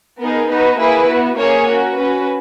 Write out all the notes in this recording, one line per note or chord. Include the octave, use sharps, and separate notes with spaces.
B3 D#4 G#4 A#4
B3 D#4 F#4 B4
A#3 E4 G#4 B4
B3 F#4
A#3 C#4 G#4 A#4 C#5
C#4 F#4 A#4
C#4 F#4 B4